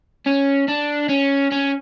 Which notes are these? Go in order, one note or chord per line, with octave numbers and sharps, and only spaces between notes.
C#4
D4
C#4
C#4